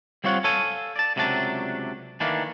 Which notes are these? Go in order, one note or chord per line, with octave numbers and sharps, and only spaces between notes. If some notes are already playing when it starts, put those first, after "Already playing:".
G3 C4 F4 C#5 F#5
A4 C#5 F5 G#5
D5 A5
C#2 C3 F#3 A3 D4 A5
D#3 E3 A3 A#3 D4